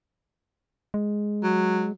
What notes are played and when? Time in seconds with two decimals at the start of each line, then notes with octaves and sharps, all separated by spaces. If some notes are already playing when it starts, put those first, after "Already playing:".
0.94 G#3
1.43 F#3